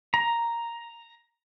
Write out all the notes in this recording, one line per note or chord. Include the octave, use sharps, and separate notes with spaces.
A#5